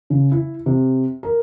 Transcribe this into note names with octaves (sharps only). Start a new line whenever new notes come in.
C#3
E4
C3
A#4